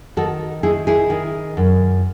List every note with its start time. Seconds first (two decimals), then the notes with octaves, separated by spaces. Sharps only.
0.17 D#3 F#4 A4
0.63 D#3 E4 G#4
0.87 E4 G#4
1.10 D#3
1.57 F#2